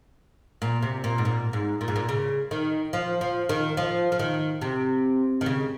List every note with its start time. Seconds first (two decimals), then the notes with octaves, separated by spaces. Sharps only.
0.62 A#2
0.82 C3
1.04 A#2
1.18 G#2
1.25 A#2
1.53 G#2
1.81 A#2
1.88 G#2
1.96 A#2
2.09 C#3
2.51 D#3
2.93 F3
3.21 F3
3.49 D#3
3.77 F3
4.12 F3
4.19 D#3
4.62 C3
5.41 D#3
5.46 C#3